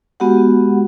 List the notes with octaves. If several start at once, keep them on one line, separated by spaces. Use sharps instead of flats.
G#3 B3 F#4 G4 F#5